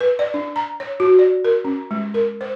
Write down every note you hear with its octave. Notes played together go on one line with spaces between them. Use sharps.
B4
D5
D4
A#5
C#5
F#4
D5
A#4
C#4
G#3
A#4
C5